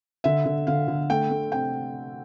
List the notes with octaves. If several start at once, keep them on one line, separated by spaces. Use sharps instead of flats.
D3 E5
D3
D3 F5
D3
A3 G5
A3
C3 G5